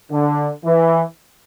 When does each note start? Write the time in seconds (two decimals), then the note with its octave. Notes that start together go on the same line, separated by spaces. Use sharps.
0.11 D3
0.64 E3